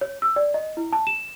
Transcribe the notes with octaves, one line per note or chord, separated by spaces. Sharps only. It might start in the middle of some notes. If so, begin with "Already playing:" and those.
C#5
E6
D5
D#5
E4
A5
E7